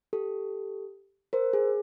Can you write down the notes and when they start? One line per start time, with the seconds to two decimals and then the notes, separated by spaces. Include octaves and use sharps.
0.13 G4 A4
1.33 A#4 C5
1.53 G#4